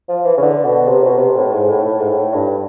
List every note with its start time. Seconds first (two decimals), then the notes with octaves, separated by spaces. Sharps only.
0.09 F3
0.25 E3
0.37 C#3
0.41 D3
0.65 B2
0.88 C3
1.03 B2
1.17 C3
1.37 A2
1.53 G#2
1.69 A2
1.85 A2
1.99 G#2
2.09 A2
2.34 G2